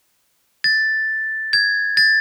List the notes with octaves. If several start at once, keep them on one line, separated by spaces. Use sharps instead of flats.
A6
G#6
A6